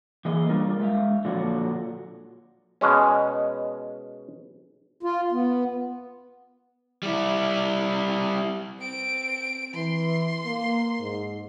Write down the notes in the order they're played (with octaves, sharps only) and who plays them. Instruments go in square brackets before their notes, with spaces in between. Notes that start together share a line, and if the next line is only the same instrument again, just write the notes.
[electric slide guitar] E3 A#3 G#4 D#5
G3 D4 F4 A#4
G#3 E5 F5
A#2 D3 F3 F#3 D4 F#4
[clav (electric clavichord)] B2 G#3 C#4
[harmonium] F4
B3
[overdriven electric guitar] G3 E4
[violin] C4 D7
[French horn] E3 [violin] C6
[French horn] A#3
G#2